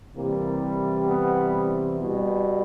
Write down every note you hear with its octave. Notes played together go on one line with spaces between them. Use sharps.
C3 E3 G3 A#3
B3
B2 G3